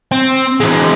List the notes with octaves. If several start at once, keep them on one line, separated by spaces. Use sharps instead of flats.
C4
E3 G#3